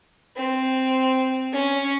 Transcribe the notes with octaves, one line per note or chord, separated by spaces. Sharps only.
C4
C#4